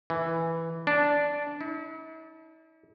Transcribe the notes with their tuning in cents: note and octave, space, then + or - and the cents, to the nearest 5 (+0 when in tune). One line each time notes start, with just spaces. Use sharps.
E3 +0
D4 -10
E4 -45